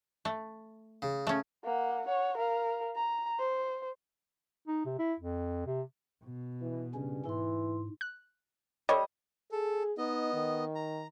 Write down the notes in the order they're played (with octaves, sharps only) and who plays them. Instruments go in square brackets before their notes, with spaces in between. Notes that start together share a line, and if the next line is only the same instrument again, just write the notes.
[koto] A3
[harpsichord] C#3
[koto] A3 C#4
[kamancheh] A#3 F#5
C#5 F#5
A#4 F5
A#5
C5
[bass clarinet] D#4
C3
E4
F2
C3
[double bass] B2
[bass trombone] E3
[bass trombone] G2 [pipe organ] C#3 C#4
[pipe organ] G#2 [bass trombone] E3 [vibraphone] E4 C6
[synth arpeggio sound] F#6
[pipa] G3 [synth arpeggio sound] A4 C#5 [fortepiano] D#5
[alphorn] G#4 [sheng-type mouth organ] A4
[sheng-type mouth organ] B3 D#5 [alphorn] D#4
[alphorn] D#3
[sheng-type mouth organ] A#5